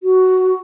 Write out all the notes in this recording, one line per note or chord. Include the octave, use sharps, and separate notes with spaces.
F#4